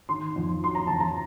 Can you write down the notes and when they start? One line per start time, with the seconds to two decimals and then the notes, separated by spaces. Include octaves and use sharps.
0.09 D#3 C6
0.36 F2
0.63 F#3 C6
0.75 A#5
0.87 F2 A5
1.00 A#5